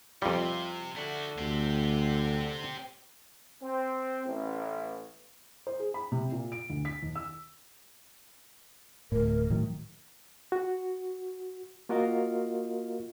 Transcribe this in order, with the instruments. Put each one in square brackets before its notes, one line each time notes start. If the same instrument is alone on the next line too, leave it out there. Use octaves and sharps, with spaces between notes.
[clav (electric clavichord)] F2 G3 [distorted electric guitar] C3 [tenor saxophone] F4
[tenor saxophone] D3 [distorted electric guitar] A3 F#4
[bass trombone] D2 [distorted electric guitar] C4 G4
[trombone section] C4
A1
[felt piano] C5
G#4
B5
C3
A#2
D7
D2
B6
D#2
E6
[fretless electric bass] D1 A2 [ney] A#4
[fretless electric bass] A2 D#3 F#3
[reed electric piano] F#4
A#3 F4 F#4 A#4 D#5 F5